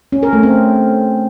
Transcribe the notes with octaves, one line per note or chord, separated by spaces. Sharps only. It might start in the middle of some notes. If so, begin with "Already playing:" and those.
C#4
A#4
A3
C4